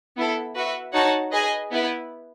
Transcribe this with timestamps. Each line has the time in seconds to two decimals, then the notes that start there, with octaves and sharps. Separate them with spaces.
0.16 B3 E4 A4
0.55 F#4 B4 E5
0.93 D#4 F#4 C#5 F#5 A5
1.32 G#4 B4 D#5 G#5
1.71 B3 E4 B4